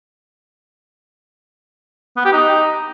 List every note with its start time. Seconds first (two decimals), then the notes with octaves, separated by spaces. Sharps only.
2.17 B3
2.25 G4
2.33 D#4